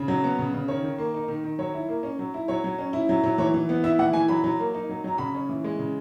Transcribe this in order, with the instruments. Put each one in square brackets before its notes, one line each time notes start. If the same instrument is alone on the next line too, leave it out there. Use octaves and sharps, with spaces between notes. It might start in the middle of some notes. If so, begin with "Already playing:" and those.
Already playing: [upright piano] C#3
F#3
B3
C#3
C#3
D#3 C#5
D#3
A#3
D#4
D#3
D#3
F#3 C#5
E4
A#3
C#4
F#3
E4
F#3 C#5
F#3
C#4
E4
F#3
F#3
E3 C#5
E3
B3
E4 E5
E3 F#5
E3 G#5
F#3 B5
F#3
A#3
D#4
F#3
F#3 A#5
C#3 B5
C#4
E3
G#3
C#3